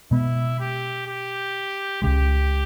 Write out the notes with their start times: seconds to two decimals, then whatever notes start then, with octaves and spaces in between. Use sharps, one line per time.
0.11 B2 G#3 B3 E4
0.60 G4
1.06 G4
2.02 C#2 C#3 G#3 G4